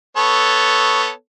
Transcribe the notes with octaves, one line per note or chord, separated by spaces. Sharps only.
B3 A4 C#5